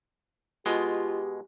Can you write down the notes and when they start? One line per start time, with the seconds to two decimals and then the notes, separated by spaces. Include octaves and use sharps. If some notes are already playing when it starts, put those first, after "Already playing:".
0.66 B2 G#3 F4 G4